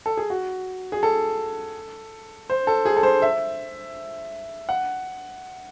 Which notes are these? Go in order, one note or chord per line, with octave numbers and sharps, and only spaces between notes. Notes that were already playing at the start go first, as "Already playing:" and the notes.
A4
G#4
F#4
G#4
A4
C5
A4
G#4
A4
C5
E5
F#5